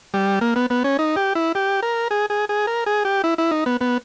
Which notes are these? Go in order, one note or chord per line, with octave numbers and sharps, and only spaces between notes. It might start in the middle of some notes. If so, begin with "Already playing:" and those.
G3
A#3
B3
B3
C#4
D#4
G4
E4
G4
A#4
G#4
G#4
G#4
A#4
G#4
G4
E4
E4
D#4
B3
B3